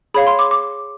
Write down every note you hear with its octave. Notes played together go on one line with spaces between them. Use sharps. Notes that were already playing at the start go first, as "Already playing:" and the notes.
G#4 C#5 F5 B5
C6
D6
D6